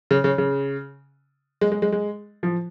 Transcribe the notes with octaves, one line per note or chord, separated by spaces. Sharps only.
C#3
C#3
C#3
G#3
G#3
G#3
G#3
F3